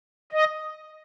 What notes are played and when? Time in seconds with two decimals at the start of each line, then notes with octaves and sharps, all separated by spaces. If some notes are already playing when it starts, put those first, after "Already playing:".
0.32 D#5